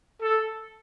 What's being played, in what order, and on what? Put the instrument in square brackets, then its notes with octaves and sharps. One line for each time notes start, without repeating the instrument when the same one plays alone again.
[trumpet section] A4